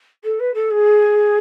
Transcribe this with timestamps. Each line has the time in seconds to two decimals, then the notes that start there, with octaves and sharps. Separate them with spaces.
0.24 A4
0.39 B4
0.54 A4
0.70 G#4